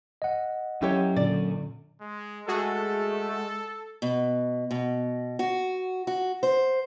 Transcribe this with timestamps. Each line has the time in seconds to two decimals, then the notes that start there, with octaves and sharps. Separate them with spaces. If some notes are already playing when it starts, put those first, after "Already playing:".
0.22 D#5 F#5
0.82 F#3 C#4 E4 G4 C#5
1.16 A#2 D3 D5
2.01 G#3
2.48 G#3 A3 F#4 G#4 A4
4.02 B2
4.71 B2
5.39 F#4
6.07 F#4
6.43 C5